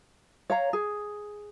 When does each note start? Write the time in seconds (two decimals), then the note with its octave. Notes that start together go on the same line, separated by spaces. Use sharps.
0.50 C#5 F5 A#5
0.73 G#4